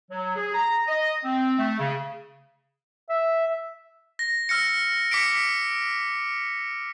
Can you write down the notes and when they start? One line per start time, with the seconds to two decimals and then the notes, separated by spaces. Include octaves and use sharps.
0.11 F#3
0.36 G#4
0.54 A#5
0.87 D#5
1.25 C4
1.59 A3
1.79 C#3
3.09 E5
4.19 A#6
4.49 E6 F6 A#6 C#7
5.11 D6 B6 C#7 D7